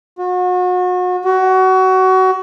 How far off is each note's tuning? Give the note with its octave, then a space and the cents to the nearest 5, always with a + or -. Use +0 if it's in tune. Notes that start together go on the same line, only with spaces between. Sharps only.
F#4 -35
F#4 +25